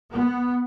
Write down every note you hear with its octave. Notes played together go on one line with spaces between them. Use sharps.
B3